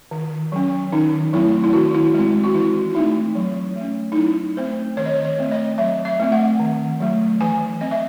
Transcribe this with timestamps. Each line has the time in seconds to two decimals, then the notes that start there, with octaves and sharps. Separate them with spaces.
0.11 D#3
0.52 F#3 C#4
0.92 D#3 D#4
1.33 F#3 A3 C4 E4
1.64 E4
1.73 D#3 F#4
1.94 E4
2.14 G#3 C4 E4
2.44 F#4
2.54 E3 E4
2.90 E4
2.95 A3 C4 D#4
3.35 F#3
3.76 A3
3.81 C#4
4.12 D#4
4.16 F#3 E4
4.57 A3 C4 C5
4.97 D#3 C#5
5.06 D#5
5.14 C#5
5.25 C#5
5.38 A3 C4
5.51 D#5
5.78 F#3 E5
6.05 E5
6.19 A3 C4
6.32 F#5
6.60 D#3
7.00 F#3 A3
7.41 E3 G#5
7.81 C4 D#5
7.91 E5